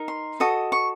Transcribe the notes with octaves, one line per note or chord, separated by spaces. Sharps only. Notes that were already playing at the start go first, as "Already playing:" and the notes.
Already playing: D#4 A#4
C6
F#4 A4 D#5 D#6
C#6